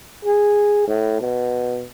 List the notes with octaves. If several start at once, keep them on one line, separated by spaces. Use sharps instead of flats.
G#4
A2
B2